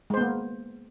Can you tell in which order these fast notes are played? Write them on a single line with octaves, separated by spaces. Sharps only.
G#3 C5 B3 A#3